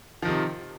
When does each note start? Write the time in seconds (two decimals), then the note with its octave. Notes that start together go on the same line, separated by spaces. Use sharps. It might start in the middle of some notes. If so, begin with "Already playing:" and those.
0.22 F3
0.25 D#3
0.28 C3